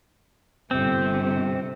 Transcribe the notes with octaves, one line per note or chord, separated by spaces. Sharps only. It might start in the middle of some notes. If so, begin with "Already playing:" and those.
G1 C3 C4